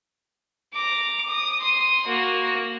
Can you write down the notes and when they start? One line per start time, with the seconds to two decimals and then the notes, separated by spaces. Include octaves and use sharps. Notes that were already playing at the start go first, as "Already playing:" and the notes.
0.74 A#5 D6
1.27 D#6
1.60 C6 D#6
2.06 A#3 F#4